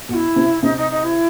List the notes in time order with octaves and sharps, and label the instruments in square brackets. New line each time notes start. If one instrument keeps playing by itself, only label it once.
[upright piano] B2 [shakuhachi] F#4
[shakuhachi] E4
[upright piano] C3
[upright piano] C3 [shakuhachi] D#4
[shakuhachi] D#4
D#4
E4